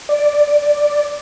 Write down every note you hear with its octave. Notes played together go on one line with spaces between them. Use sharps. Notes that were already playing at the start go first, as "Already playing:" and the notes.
D5